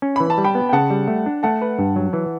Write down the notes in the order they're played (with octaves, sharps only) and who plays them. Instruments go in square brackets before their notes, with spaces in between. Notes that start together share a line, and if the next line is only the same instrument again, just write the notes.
[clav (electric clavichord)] C#4
[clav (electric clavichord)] E3 [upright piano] B5
[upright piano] A5
[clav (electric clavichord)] G3
[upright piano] G5 B5
[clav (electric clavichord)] B3
[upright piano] G5
[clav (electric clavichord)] C#3 [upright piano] F#5 A5
[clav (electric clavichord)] G3
A3
D4
[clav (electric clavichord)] A3 [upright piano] F#5 A5
[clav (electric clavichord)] B4
G2
F#3
E3